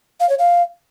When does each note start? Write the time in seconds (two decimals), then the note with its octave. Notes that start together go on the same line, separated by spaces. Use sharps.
0.20 F5
0.29 C#5
0.39 F5